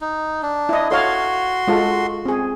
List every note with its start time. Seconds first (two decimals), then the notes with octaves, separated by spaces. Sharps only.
0.01 D#4
0.43 D4
0.69 E4 D#5
0.91 F#4 A4 C#5 F5 C6
1.67 G#3 F4 A4
2.25 C4 G#4